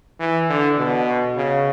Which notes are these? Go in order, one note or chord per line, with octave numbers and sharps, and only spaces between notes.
E3
D3
B2
C#3